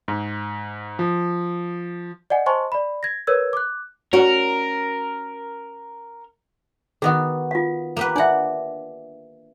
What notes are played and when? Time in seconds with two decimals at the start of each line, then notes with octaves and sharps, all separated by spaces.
0.08 G#2
0.99 F3
2.30 D5 D#5 F#5 G#5
2.46 C5 D#5 G#5 A5 C6 C#6
2.72 D5 B5
3.03 G#6 A#6
3.27 A#4 B4 C#5 E6 G#6
3.53 D6 F#6
4.13 C#4 F#4 A#4
7.02 D#3 B3 F#4 G#4 D#5
7.51 F4 F5
7.97 A#3 G4 B4
8.16 D4 D5 E5 F#5